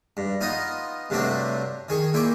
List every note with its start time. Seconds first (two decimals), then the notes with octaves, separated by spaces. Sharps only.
0.17 G2
0.41 B3 D#4 F4 D#5
1.10 G2 C3 F#3 A3 C4 D4
1.89 D#3 G#4 C#6
2.13 A#2 E4 G5 C#6 D6